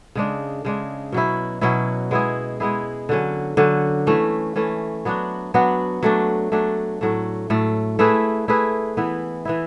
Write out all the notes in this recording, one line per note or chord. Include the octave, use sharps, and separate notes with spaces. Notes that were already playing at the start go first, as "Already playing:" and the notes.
C#3 G#3 D4
C#3 G#3 D4
B2 F#3 C#4 E4
B2 F#3 C#4 E4
G#3 B3 E4 G#4
G#3 B3 E4 G#4
D3 F#3 C#4
D3 F#3 C#4
E3 A3 C#4
E3 A3 C#4
F#3 B3 D4 F#4
F#3 B3 D4 F#4
F#3 A3 D4
F#3 A3 D4
A2 F#3 A3
A2 F#3 A3
A3 E4 G#4 B4
A3 E4 G#4 B4
E3 B3 E4
E3 B3 E4